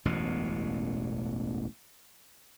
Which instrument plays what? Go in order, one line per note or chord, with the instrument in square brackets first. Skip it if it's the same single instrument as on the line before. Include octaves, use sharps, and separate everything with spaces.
[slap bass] E1 A1 F#2 B2